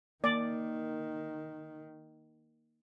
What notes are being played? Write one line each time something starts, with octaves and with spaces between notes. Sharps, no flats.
D#3 A#3 D5